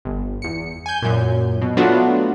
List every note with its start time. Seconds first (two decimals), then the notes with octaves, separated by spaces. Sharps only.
0.05 G1
0.42 E2 C#7
0.86 G#5 G6
1.02 F#2 A#2
1.62 B2
1.77 F#3 A3 B3 D4 F4 F#4